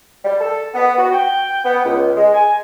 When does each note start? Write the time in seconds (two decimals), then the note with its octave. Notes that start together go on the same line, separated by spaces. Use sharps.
0.23 G3
0.40 A4
0.74 B3
0.98 F#4
1.13 G5
1.63 B3
1.84 C#2
2.15 G#3
2.34 G#5